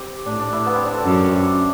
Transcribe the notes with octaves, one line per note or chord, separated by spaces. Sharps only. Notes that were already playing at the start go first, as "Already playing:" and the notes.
Already playing: C4 G4
A2 D4
D4
E4
B3
C4
D4
A4
F#2